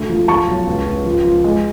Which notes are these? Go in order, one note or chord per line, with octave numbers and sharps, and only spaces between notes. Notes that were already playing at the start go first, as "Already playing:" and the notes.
Already playing: D2 A3
F3
F3 A5 C#6
B1
C#2
C#2
F3
F3
G#3